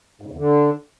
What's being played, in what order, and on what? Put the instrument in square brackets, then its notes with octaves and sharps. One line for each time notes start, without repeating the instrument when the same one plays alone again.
[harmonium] G#2
C#3
E2
D3